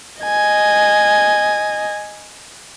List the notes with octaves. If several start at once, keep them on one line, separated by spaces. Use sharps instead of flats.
D#5 G#5